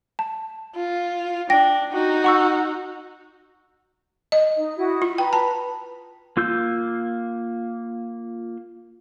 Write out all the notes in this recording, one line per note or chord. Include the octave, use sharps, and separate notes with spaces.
A5
F4
D4 G5 A#6
D#4 F#4
F#5 C#6 E6
D#5
D#4
E4 F#4 D#6
F4
B4 G5 A#5 B5
A5
A#3 F4 E6 G6